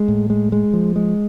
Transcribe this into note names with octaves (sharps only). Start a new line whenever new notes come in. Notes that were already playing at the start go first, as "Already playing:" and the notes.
Already playing: G#3
A2
G#3
G#3
F3
G#3